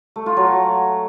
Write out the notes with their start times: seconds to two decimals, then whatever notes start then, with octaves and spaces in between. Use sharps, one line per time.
0.16 A3
0.26 F4
0.37 F#3